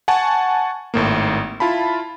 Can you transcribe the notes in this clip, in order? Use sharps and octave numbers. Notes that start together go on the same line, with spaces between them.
F#5 G#5 A5 C#6
G#1 A2 A#3
E4 F4 A5 B5